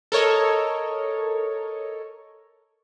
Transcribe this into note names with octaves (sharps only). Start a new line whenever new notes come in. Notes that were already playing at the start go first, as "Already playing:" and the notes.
A4 A#4 C#5 D#5